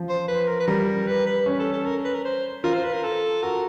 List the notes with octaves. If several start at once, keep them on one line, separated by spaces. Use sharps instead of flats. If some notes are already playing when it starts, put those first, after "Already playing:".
Already playing: F3
C5
B4
A#4
B4
G3 A#4
B4
B4
C#4
A4
A4
A#4
B4
A#4
C5
F4 A#4
C5
B4
A#4
A4
F#4 A#4